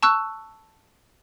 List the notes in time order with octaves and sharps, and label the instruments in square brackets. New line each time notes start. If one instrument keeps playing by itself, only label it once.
[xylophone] A5 C#6 E6 F#6